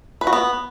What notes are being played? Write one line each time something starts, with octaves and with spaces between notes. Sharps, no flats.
B4
F#4
B3